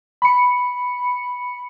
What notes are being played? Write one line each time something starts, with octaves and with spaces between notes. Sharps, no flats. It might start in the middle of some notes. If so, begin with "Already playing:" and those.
B5 C#7